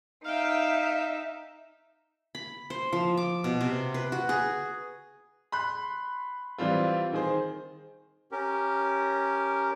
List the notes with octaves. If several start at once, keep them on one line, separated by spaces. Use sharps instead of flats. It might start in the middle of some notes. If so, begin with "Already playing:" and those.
D#4 E5 F5 G5
B5
C5
F3
D6
B2
C3
B4
F#4
G#4
B5 C6 F#6
E3 G3 C4 F4
D#3 G#4 C5
C#4 G4 A#4